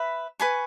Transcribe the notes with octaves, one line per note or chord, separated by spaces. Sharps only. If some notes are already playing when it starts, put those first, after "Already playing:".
Already playing: B4 E5 B5
B4 G#5 C#6